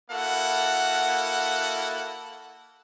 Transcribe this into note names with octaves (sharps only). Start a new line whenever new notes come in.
A#3 E4 F#4 A4 F#5